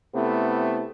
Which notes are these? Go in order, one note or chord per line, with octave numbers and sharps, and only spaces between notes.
C3 A3 B3 E4